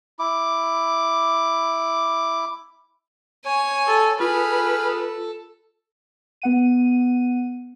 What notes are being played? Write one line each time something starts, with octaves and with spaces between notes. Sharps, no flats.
E4 D6
C#5 G#5
A4
F4 G#4 A4 B4 B5 F6
B3 F#5 D#7